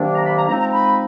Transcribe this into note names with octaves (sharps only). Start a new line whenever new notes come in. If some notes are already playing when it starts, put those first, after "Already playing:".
Already playing: C3 D#3 F#3 A#3 D4
A#5
B5
A#5
F3 G#3 C4 D#4 A#5
A#5
B5